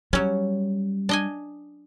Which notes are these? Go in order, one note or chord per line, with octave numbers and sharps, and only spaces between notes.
F#3 G3 C#4
D4 D#5 G#5